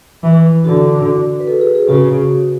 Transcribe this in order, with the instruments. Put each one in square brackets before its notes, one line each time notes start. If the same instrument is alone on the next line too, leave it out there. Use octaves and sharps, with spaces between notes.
[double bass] E3 [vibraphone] E4
[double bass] D3 [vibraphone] F#4
[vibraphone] B4
A4
G#4
G#4
[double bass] C#3 [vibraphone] F#4